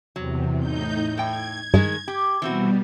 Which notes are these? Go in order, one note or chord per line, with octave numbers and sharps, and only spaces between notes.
E2 C3 F#3
A2 D#4 G6
A2 G5 G#6
G2 D#3 G#3
G4
B2 E3 G3 C4 F#4